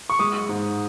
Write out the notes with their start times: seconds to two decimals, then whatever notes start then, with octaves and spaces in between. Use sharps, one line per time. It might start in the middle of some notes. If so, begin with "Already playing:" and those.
0.10 C#6
0.19 G#3 D#6
0.49 G#2